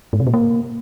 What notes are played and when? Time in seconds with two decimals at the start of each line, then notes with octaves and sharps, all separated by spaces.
0.13 G#2
0.20 C3
0.27 A#2
0.34 A#3